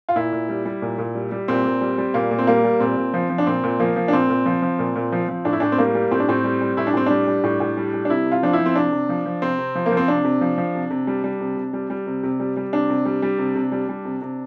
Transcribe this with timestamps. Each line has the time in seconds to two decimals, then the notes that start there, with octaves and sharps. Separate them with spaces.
0.09 F4
0.16 A#2 E4
0.32 A#2
0.49 G3
0.65 G3
0.82 A#2
0.98 A#2
1.15 G3
1.32 G3
1.48 A#2 C4
1.65 A#2
1.81 G3
1.98 G3
2.14 A#2 A#3
2.31 A#2
2.38 C4
2.47 G3 A#3
2.64 G3
2.80 A#2 C4
2.97 A#2
3.14 F3
3.30 F3
3.38 D4
3.47 A#2 C4
3.64 A#2
3.80 F3 A#3
3.96 F3
4.08 D4
4.13 A#2 C4
4.30 A#2
4.46 F3
4.62 F3
4.79 A#2
4.96 A#2
5.12 F3
5.29 F3
5.45 A2 D4
5.53 E4
5.60 A2 D4
5.72 C4
5.78 G3 A#3
5.95 G3
6.11 A2 C4
6.20 D4
6.28 A2 C4
6.44 G3
6.61 G3
6.77 A2 E4
6.87 D4
6.94 A2 C4
7.06 G3 D4
7.27 G3
7.44 A2
7.60 A2
7.77 G3
7.93 G3
8.05 D4
8.10 C3 E4
8.26 C3
8.32 F4
8.43 F3 D4
8.53 E4
8.59 F3
8.66 C4
8.76 C3 D4
8.92 C3
9.09 F3
9.25 F3
9.42 C3 C4
9.58 C3
9.75 F3
9.86 A#3
9.92 F3
9.97 C4
10.08 C3 D4
10.25 C3
10.41 F3
10.58 F3
10.75 C3
10.90 C3
11.07 G3
11.24 G3
11.40 C3
11.57 C3
11.73 G3
11.90 G3
12.07 C3
12.23 C3
12.40 G3
12.57 G3
12.73 C3 D4
12.89 C3
13.05 G3
13.22 G3
13.38 C3
13.56 C3
13.72 G3
13.89 G3
14.05 C3
14.22 C3